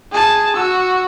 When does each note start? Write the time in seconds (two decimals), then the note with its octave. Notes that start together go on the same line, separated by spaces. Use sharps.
0.12 G#4 A5
0.56 F#4 E6